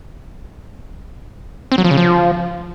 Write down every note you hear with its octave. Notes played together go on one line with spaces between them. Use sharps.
C4
F#3
F3
C#3
F3